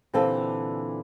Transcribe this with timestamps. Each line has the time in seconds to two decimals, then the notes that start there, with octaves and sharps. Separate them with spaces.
0.13 A#2 D3 E3 C4 G4 A4